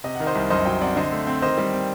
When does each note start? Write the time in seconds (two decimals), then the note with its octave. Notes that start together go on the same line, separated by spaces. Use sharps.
0.04 C3 D#5
0.15 D#3 F#5
0.26 C5 D#5
0.35 C2
0.50 F#2 C5 D#5
0.65 F#3 D#5 G5
0.81 C4 D5 F#5
0.96 D3 C5 D#5
1.12 A3
1.27 C4
1.42 D#3 C5 D#5
1.58 G3
1.73 C4